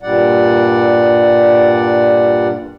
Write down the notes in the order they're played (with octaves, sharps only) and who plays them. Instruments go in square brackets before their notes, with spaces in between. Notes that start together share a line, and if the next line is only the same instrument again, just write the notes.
[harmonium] G2 A#2 G3 D5 F#5